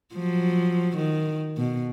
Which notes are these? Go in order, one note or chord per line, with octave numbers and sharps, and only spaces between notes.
F3 F#3
D#3
B2